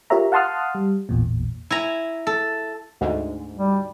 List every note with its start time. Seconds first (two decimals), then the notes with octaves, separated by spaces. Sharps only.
0.10 F4 G4 A#4 C#5 E5 A#5
0.32 F5 F#5 A5 C6 D#6 F6
0.75 G3
1.09 A1 E2 A#2
1.70 E4 G#5 A#5
2.27 A4
3.01 D2 G#2
3.56 G3